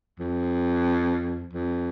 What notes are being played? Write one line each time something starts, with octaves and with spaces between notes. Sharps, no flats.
F2
F2